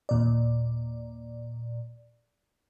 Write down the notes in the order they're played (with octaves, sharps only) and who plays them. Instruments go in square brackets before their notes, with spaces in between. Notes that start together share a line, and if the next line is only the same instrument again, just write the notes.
[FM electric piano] D#2 A#2 D5